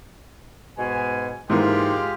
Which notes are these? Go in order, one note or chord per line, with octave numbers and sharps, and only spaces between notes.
G#2 B2 G#5
G#2 E3 G#3 A#3 F4 G4